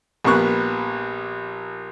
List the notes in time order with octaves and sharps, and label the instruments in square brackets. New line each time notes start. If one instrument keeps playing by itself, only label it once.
[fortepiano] A#1 G3 A#3 B3 C#6 F#6